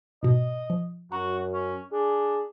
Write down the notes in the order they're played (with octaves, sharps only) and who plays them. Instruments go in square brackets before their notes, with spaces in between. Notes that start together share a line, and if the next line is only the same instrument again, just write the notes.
[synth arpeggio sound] G#2 B2 [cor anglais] D#5
[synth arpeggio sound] F3
[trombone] F#2 [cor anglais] F#4 [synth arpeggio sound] A#5
[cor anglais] C#4
[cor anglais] D4 [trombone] G#4